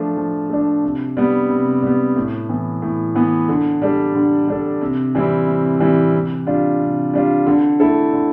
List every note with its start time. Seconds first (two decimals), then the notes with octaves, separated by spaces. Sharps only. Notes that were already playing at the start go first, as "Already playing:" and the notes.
Already playing: F3 A3 D4
0.17 F3
0.50 A3 D4
0.83 C3
1.17 G3 B3
1.50 C3
1.83 G3 B3
2.16 A2
2.49 E3 B3
2.82 A2
3.15 E3 B3
3.49 D3
3.82 G3 D4 A4
4.15 D3
4.48 G3 D4 A4
4.81 C3
5.15 E3 G3 C4 E4
5.48 C3
5.80 E3 G3 C4 E4
6.14 C3
6.47 G3 D4 F4
6.80 C3
7.13 G3 D4 F4
7.47 D3
7.80 A3 E4 A4
8.13 D3